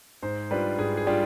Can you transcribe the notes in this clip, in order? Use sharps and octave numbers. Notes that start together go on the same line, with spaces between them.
G#2 C5
G3 D4 F4 B4
G#2 G#4
G#4
G3 D4 F4